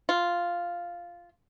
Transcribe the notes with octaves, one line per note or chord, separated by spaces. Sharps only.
F4